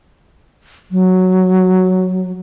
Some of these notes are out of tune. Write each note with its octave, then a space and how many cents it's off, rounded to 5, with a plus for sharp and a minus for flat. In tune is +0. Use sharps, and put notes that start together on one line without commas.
F#3 +0